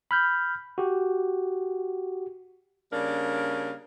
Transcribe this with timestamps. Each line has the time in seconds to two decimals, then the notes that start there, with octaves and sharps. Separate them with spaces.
0.11 B5 F6 G6
0.78 F#4 G4
2.92 C#3 G3 A#3 D4 A#4